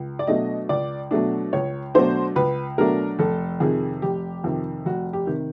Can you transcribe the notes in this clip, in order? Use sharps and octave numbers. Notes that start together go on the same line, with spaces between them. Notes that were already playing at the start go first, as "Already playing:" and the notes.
Already playing: C#2
D5
B2 F#3 A3 D4 D#5
C#2 D5
B2 F#3 A3 D4
C#2 C#5
B2 F#3 A3 D4 C5
C#2 B4
B2 F#3 A3 D4 A#4
F1 A4
F2 C3 D#3 G#4
F1 G4
F2 C3 D#3
F1 F#4
G4
C3 D#3